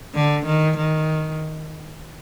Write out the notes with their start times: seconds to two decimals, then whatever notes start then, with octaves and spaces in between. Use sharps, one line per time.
0.15 D3
0.46 D#3
0.77 D#3